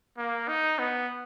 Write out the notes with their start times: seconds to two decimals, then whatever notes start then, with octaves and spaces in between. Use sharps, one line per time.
0.18 A#3
0.48 D#4
0.79 B3